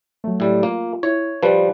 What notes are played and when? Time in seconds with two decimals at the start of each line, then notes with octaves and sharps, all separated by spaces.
0.24 F#3 A3
0.40 A2 G3
0.63 A#3 F4
1.03 E4 C#5
1.43 F3 G3 B4